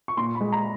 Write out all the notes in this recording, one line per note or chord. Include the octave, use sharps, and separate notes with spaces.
C#6
A#2 C6
B5
G#3
A#5